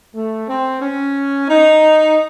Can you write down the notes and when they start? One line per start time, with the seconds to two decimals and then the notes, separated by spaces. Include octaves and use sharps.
0.15 A3
0.48 C4
0.81 C#4
1.48 D#4